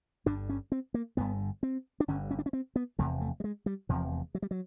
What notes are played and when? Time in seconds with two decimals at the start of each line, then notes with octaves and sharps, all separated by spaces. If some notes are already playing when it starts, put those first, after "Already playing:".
0.26 G1 G2 D3 D4
0.49 C#4
0.72 C4
0.94 A#3
1.17 G1 G2 D3 B3
1.63 C4
2.00 D4
2.08 G1 G2 D3 C#4
2.31 C#4
2.39 D4
2.46 C#4
2.53 C4
2.76 B3
2.98 F1 E2 C3 A3
3.21 A3
3.40 G3
3.44 G#3
3.66 G3
3.89 F1 E2 C3 F3
4.35 F#3
4.42 G3
4.51 F#3